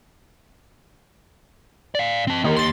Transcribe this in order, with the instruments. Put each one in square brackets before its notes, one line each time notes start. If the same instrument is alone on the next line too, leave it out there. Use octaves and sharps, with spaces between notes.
[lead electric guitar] D5 F5
C4 A5
[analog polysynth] D#3 [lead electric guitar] A#3 G4
[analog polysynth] C6 A6